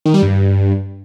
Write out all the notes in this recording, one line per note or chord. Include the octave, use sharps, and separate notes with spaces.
D#3
G3
G2